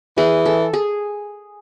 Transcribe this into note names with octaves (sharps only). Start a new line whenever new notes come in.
E3 G#4
A4
G#4